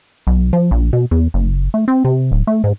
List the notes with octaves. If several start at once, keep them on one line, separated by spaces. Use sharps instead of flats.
B1
F3
A#1
B2
E2
F#1
A3
C4
C3
D1
A3
G#2